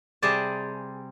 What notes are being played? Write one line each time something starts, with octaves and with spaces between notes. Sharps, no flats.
C3 G3 G#4 C5 D5 A5